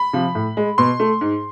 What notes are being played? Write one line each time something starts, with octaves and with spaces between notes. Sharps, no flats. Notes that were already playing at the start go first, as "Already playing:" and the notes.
Already playing: B5
C3 F3
A2
G#3
B2 C6
A3
G#2